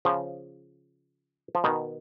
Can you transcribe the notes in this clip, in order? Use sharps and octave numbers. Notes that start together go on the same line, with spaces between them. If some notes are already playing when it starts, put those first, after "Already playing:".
C#3 F3
F3
B2 D#3